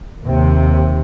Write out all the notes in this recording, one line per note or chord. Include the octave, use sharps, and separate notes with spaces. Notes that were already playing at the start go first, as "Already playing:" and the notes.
D#2 C3